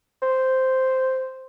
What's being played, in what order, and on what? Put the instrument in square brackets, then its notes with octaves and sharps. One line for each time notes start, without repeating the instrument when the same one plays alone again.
[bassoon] C5